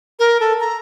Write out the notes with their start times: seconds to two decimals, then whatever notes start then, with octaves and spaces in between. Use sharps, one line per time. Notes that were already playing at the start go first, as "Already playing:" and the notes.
0.19 A#4
0.40 A4
0.60 A#5